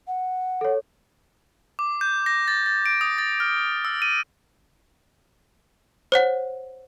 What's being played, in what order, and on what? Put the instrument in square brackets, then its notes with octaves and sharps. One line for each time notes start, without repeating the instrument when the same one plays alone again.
[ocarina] F#5
[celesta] A4 C#5
[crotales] D6
G6
A#6
A6
A6
D7
D#6
A6
F6
E6
D#7
[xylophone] C5 C#5 F#5